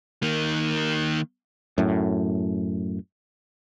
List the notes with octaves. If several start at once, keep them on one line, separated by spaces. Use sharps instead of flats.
D#3 A#3
F#2 A2